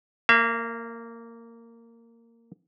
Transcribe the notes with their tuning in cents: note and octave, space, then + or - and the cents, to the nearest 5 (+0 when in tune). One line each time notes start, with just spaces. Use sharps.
A#3 -15 E5 +40